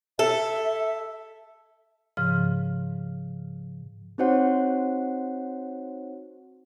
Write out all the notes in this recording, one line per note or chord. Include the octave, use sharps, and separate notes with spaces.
A4 E5
G#2 C#3 F3 F6
C4 D#4 F#4 C5 C#5 F#5